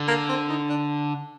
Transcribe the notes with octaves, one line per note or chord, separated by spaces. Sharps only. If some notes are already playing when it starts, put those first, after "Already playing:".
Already playing: D3
A#3
C4
D#4
D4